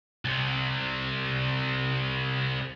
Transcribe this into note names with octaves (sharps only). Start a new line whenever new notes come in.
C2 C3